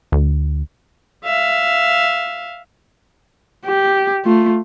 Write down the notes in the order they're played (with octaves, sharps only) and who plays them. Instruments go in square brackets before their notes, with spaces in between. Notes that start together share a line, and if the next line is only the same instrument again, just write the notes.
[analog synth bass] D2
[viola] E5 F5
[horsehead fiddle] G4
A3 F4